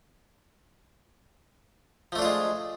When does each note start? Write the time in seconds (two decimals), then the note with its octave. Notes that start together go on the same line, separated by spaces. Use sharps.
2.12 F3
2.16 A3
2.19 D4
2.22 F4
2.25 G#3